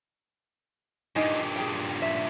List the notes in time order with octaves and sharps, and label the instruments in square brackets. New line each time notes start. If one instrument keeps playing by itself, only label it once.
[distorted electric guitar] G2 A#2 [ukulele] D#4 G#5
[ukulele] G#4 G5
E5